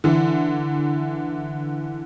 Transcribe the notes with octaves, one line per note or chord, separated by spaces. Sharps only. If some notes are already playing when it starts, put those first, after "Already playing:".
D3 E3